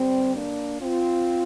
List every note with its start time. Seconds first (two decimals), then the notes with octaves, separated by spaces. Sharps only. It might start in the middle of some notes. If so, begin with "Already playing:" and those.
Already playing: G2 D3 G3 C4
0.35 A#3 D4
0.81 C4 F4